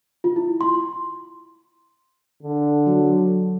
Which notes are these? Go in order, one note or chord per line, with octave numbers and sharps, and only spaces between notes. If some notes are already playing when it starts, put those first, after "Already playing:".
F4
E4
C6
D3
F#3